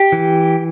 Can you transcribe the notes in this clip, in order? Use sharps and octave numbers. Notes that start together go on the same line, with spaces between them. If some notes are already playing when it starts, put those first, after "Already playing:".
Already playing: G4
E3